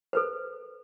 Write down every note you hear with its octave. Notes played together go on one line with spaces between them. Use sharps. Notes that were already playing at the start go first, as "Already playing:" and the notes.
A4 B4 C5